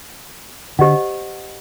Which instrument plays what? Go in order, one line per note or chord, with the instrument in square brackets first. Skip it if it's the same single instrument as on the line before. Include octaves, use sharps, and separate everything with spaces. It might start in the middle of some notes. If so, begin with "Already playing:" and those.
[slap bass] D3 [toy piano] G4 C5 D#5 F#5